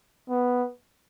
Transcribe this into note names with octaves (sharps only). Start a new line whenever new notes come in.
B3